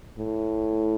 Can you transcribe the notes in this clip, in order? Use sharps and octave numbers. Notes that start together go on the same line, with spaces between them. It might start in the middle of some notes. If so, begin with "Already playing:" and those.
A2